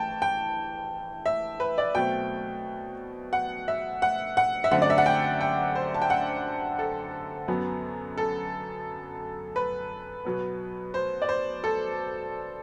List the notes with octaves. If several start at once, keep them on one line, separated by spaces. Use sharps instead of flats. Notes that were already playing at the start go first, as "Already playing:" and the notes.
Already playing: A2 E3 A3 G5 A5
G5
E5
B4
D5
B2 F#3 A3 C4 G5
F#5
E5
F#5
F#5
E5
F#2 D3 A3 C4 F#5
D5
E5
F#5
G5
G5
C5
A5
G5
F#5
A4
F#2 F#3 B3
A4
B4
B2 F#3 B3
C5
D5
C5
A4